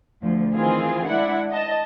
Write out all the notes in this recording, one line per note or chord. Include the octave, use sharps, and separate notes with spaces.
D2 F3
D#3 E3 C4 F4 G#4
G#3 D4 E4 F#5
D#5 A5